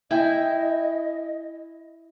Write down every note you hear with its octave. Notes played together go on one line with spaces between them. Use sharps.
E4 D#5 E5 G5 G#5